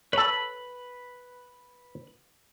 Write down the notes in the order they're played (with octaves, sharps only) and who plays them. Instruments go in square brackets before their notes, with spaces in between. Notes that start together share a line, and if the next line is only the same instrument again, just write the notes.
[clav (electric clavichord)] A4 C#5 [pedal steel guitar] B4 B5